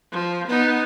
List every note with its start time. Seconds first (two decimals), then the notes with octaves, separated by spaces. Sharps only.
0.12 F3
0.48 B3 D#4